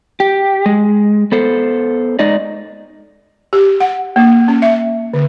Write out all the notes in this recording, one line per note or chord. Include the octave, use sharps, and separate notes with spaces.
G4
G#3
B3 A4 C5
G#3 D#4 D5 D#5
G4
F#5
A#3
C#4
E5
D3